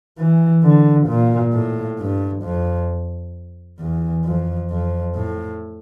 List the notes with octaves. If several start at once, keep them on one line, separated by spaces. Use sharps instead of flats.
E3
D3
A#2
A2
G2
F2
E2
F2
F2
A2